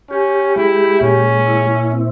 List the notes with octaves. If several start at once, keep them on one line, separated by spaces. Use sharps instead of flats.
C#4 G4
G#3 E4
A#2 C#4
E4
C4